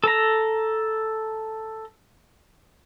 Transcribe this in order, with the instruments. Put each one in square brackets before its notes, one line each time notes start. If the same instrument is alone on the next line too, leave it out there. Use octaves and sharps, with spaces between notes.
[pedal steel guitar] A4 A#5